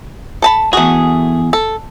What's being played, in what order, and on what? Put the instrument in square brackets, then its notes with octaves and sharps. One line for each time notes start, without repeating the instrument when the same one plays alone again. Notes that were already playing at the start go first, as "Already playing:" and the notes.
[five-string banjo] A4 A5 B5
[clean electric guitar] E2 G#4 [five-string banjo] A3 F#4
[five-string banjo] A4